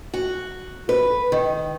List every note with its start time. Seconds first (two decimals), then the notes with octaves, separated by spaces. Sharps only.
0.14 F#4
0.89 B4
1.32 D#3